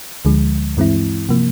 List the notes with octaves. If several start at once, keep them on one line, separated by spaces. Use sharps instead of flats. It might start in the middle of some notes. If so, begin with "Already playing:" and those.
D2 D3 F3 G#3
G2 E3 G#3 C4 E4
C3 F3 A#3